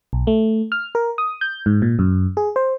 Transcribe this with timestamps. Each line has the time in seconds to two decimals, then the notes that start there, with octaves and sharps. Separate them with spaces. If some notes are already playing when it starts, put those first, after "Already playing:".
0.13 B1
0.27 A3
0.72 F6
0.95 A#4
1.18 D#6
1.41 G6
1.66 G#2
1.82 A#2
1.99 F#2
2.37 G#4
2.56 C5